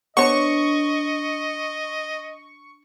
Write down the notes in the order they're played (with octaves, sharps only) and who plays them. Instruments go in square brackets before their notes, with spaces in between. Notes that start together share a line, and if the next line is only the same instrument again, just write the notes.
[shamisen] B3 C#5 [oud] D4 [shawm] D#5 [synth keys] C#6